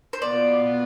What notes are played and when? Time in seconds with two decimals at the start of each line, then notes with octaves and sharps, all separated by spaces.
0.13 C5
0.22 B2 B3 F4 D5